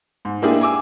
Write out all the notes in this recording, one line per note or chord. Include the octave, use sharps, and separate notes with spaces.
G#2
G#3 A#3 D4 E4 G4 G#4
G#5 D6 E6